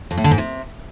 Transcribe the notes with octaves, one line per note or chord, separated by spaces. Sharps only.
F2
A2
D3
G#2
C3